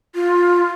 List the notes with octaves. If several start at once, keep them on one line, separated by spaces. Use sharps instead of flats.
F4